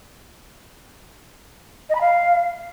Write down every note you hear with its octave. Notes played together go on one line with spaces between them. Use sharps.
D#5
B5
F5